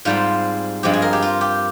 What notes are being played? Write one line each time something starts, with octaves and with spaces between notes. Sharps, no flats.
G#2 G3 C4 F4
G2 F3 G#3 C4 G4
G#4
A#4
G4
F4
G4